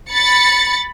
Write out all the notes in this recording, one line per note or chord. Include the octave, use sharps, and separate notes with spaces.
B5 A6 C#7